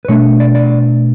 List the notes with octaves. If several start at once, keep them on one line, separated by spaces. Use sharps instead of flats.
B4
B2 A3 D4 C#5
D5
D5